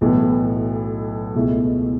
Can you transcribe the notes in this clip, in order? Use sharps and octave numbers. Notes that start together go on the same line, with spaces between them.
B1 A2 E3 B3 A4
C#2 B2 A3 E4